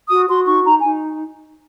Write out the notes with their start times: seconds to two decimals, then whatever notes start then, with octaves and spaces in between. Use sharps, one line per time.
0.08 F#4 D#6
0.28 F#4 C6
0.46 D#4 C#6
0.66 D#4 A#5
0.81 D#4 G#5